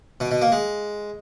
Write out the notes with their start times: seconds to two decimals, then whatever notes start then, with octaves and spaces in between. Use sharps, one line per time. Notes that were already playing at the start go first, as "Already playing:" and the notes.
0.20 B2
0.31 B2
0.41 A#3
0.52 G#3